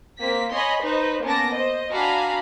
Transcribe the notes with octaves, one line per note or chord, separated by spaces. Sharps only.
A#3 C4 B6
C#5 D#5 G#5 B5 C6
D#4 B4 C5
A#3 B3 C#4 A5 D6 A#6
C5 D#5
D4 F#4 F5 G#5 A#5 B5